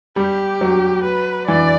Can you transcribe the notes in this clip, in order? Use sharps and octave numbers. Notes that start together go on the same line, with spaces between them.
G3 G4
F#3
B4
E3 D5